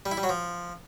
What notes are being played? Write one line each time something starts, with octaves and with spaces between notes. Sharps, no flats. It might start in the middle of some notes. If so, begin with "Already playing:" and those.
G3
E4
G3
F#3
F3